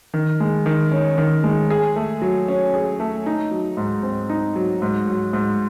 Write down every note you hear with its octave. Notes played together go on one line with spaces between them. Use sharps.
D#3
G#3
D#3
C#4
D#3
G#3
G#4
A3
F#3
C#4
G#4
A3
D#4
F#3
G#2
C4
D#4
F#3
G#2
F#3
G#2